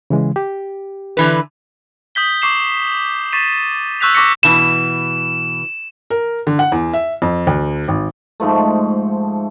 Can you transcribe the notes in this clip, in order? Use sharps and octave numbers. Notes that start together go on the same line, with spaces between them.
C#3 E3 G#3
G4
D3 E3 B4
D#6 G6 B6 G7
C#6 D6 C7 E7
C#6 A6 B6 C7 D#7 E7
C#6 E6 F#6 G6 B6 F7
C#6 D6 A#6 B6 C#7 G7
B2 E3 E7
A#4
D3
F#5
E2
E5
F2
D2
G#1
G#2 F3 A3